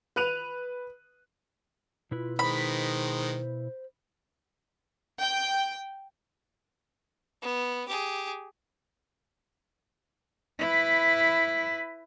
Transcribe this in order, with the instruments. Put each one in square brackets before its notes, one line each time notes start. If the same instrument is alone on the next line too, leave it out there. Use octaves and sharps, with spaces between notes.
[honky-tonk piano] B4 F#6 D#7 F7
[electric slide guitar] B2 E4 B4 [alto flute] F4
[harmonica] D#3 G#3 [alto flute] C5 [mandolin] B5
[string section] G5
[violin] B3
G4 G#4
[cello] E4 B4